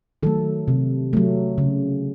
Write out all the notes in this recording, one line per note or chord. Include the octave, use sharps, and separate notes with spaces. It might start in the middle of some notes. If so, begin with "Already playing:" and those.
D#3 F#3 A3 A4
C3
F#3 A3
C#3